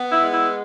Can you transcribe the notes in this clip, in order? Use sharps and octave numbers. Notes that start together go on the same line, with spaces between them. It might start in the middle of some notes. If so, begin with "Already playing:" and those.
Already playing: B3
E4
G#3
E4